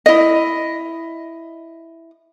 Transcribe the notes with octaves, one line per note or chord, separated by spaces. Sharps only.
E4 D#5